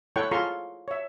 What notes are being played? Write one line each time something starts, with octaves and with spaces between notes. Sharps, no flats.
E4 A4 C#5 F#5 G5 C#6
F4 G#4 A4 A#5 C6 C#6
C#5 E5